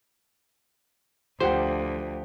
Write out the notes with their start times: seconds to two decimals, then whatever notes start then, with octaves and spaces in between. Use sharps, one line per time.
1.40 D2 F3 G4 C5 F#5 G5